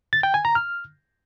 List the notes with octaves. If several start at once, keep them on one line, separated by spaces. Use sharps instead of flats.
A6
G5
G#5
A#5
F6